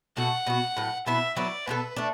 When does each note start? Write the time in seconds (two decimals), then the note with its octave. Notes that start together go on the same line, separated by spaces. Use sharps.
0.17 B2 A3 F#4 A4 F#5
0.46 B2 B3 F#4
0.77 A2 F#3 B3
1.06 B2 B3 E4 E5
1.36 F#3 B3 E4 D5
1.66 B2 B3 E4 A4 B4
1.96 A3 D4